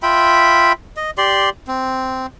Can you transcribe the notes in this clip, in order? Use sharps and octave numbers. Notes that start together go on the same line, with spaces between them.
F4 E5 G5 B5
D#5
G4 D5 C6
C4